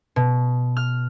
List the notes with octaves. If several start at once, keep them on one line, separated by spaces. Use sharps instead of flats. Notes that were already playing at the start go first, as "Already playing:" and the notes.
B2
F6